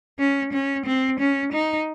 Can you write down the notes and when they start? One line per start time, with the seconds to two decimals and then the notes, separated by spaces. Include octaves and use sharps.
0.19 C#4
0.53 C#4
0.86 C4
1.20 C#4
1.53 D#4